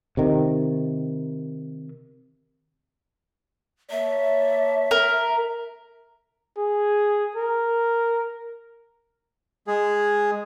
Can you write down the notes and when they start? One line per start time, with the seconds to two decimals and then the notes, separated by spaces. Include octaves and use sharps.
0.17 C3 D#3
3.91 A#3 C#5 E5 A5
4.91 A#4
6.58 G#4
7.36 A#4
9.67 G#3 G#4